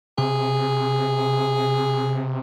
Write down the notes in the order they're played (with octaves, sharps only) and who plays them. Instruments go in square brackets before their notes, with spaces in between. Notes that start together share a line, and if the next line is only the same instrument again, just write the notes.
[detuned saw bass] C3 [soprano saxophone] G#4